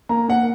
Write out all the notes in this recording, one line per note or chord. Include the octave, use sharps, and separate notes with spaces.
A#3 A#5
A#3 F#5